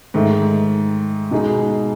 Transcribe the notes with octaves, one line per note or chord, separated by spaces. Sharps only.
G#2 D#3 A3
B2 G#3 D#4 G#4